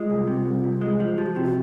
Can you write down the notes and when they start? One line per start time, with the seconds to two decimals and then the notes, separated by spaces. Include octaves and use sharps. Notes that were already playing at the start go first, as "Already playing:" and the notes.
Already playing: G#3 F4
0.09 C2
0.27 C3
0.46 C2
0.64 C2
0.81 G#3
1.00 F3
1.18 F3 G4
1.26 F#4
1.35 C3 F4
1.44 F#4